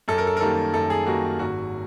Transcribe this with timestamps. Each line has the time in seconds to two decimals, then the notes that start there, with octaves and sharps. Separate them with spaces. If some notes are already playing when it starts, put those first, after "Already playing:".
0.08 F#2 A4
0.18 A#4
0.27 A4
0.37 A#4
0.41 D#3 G3 A#3 A4
0.74 F#2 A4
0.90 G#4
1.06 D#3 G3 A#3 F#4
1.39 G#1 F#4